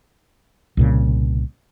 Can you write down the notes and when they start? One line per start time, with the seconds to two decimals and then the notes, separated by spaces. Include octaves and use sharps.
0.77 C2 A#2 C#3